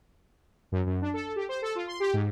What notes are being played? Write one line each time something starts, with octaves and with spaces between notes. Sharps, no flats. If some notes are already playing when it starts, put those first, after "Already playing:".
F#2
F#2
D4
A4
G4
C5
A4
F4
C6
G4
G#2